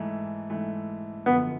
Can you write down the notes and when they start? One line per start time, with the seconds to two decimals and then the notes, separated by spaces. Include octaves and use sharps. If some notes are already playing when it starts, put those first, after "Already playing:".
Already playing: G#2 E3 A3
0.50 G#2 E3 A3
1.26 F#2 D3 F3 B3